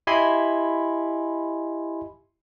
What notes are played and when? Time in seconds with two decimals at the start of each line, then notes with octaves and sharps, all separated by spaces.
0.07 E4 G4 D#5 G#5 B5 C6